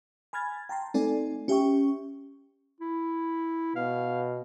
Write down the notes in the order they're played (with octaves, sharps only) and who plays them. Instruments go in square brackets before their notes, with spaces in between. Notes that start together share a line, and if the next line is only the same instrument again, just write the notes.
[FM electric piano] G#5 B5 F6 G#6 A6
G5 A5 A#5 C6
A3 C4 D#4 A4 D5 G#5
C#4 G4 E5 G5 C#6
[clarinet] E4
[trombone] B2 [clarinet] F5